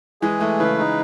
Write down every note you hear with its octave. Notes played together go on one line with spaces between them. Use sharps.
E3 G#3 G#4
E3 G#3 A3
C#3 E3 B4
D#4